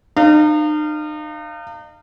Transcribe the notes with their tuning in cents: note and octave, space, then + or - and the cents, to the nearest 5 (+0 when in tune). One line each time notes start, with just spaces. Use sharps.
D#4 -40 C5 +35 F5 -20